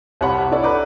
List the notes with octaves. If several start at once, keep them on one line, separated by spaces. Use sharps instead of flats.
C2 C3 C#5 F#5 A5 B5
D4 E4 A4 C#5 D5
B4 A#5 D6